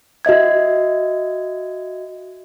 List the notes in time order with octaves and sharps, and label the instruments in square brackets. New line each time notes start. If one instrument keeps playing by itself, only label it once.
[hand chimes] F#4 D#5 E5 G#6